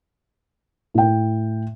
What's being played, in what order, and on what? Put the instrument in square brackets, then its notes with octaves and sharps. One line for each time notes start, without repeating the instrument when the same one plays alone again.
[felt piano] A2 G5